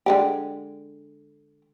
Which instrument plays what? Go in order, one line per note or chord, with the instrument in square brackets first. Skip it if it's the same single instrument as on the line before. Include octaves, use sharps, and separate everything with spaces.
[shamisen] D3 G#3 G4